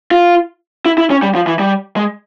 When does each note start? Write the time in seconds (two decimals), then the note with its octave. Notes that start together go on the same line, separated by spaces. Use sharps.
0.11 F4
0.86 E4
0.98 E4
1.10 C#4
1.23 G3
1.35 F3
1.47 E3
1.59 G3
1.96 G#3